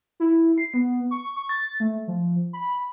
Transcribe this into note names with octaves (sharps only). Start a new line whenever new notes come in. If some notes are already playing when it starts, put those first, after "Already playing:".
E4
C7
B3
C#6
C#6
A6
A3
F3
B5